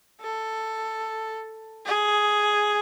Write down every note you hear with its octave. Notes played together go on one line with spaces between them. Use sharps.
A4
G#4